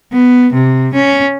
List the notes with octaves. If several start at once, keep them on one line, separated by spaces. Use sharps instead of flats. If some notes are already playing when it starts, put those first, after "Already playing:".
B3
C3
C#4